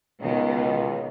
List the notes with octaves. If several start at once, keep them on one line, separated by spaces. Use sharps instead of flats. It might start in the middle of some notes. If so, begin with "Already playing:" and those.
C#2 B2 D#3